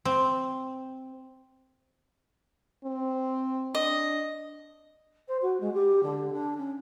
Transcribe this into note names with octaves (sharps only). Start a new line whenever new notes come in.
C4
C4
D4 D#5
C5
F#4
G#3
G4
D3
D4
C#4